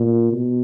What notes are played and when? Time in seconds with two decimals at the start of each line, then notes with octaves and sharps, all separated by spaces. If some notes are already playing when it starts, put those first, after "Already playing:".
Already playing: A#2
0.32 B2